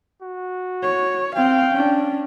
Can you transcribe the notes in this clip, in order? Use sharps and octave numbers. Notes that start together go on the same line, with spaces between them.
F#4
C#5
C4 F5 G5
C#4 D4